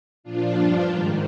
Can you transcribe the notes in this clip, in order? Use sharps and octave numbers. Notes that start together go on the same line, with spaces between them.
A#2 F3 D4 F4
G2 F3
G#2 D#3